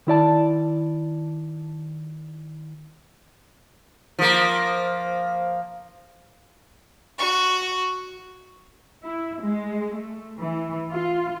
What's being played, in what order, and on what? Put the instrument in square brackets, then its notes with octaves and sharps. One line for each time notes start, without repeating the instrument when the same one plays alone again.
[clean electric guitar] D#3 E4 D5 A5
[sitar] F3 A#3
[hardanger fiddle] F#4 C#6
[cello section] E4
G#3
A3
E3
F4